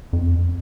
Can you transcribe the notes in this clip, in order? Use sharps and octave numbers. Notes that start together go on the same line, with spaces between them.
F2